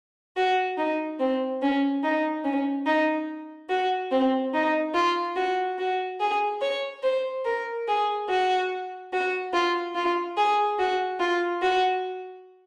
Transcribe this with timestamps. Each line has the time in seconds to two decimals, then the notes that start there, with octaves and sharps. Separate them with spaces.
0.36 F#4
0.77 D#4
1.19 C4
1.61 C#4
2.03 D#4
2.44 C#4
2.85 D#4
3.69 F#4
4.10 C4
4.53 D#4
4.94 F4
5.36 F#4
5.77 F#4
6.20 G#4
6.61 C#5
7.03 C5
7.44 A#4
7.87 G#4
8.28 F#4
9.12 F#4
9.53 F4
9.94 F4
10.37 G#4
10.78 F#4
11.19 F4
11.62 F#4